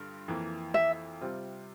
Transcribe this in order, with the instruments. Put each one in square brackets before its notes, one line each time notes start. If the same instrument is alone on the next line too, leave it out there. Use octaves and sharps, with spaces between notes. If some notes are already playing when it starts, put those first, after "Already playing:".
Already playing: [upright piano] G2 D3 F4
F2 E3 A#3
[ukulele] E5
[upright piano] C3 G3 C4 F4